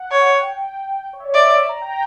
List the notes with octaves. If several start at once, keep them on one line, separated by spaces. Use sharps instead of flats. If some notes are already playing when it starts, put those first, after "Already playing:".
Already playing: F#5
C#5
G5
G5
C#5
E5
D5
D5 E5
A#5
G5